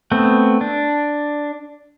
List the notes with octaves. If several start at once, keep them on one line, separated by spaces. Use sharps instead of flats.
A3 B3 C4
D4